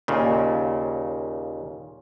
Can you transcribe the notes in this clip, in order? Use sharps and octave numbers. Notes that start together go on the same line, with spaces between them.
D#2 A#2 C#3